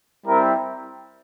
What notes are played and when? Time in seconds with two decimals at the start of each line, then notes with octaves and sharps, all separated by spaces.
0.26 G3 C4 E4 A#4